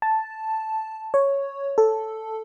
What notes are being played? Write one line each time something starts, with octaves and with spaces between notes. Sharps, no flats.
A5
C#5
A4